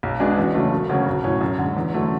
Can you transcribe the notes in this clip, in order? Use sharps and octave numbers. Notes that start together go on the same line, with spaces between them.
B1
B2 G#3 D4 G#4
E2
C#3 F#3 A3
E1
D2 C#3 F#3 C#4
B1
A2 F#3 C#4
F#2
D3 G#3
E2
D3 F#3 A3 C#4